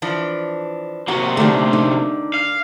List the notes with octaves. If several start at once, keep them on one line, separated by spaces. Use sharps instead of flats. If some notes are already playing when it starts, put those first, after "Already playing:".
E3 F3 D4
C3 A#3 F#4
D3 D#3 A3 D4 G4
D#4
F5